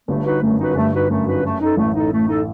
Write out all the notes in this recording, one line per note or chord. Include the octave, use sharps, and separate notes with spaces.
G1 G2 A3
D#4 F#4 B4
F#2 A3
D#4 F#4 B4
G1 G2 A3
D#4 F#4 B4
F#2 A3
F#2 D#4 F#4 B4
A3
D#4 A4
A1 A2 A3
D#4 A4
A3
D#4 A4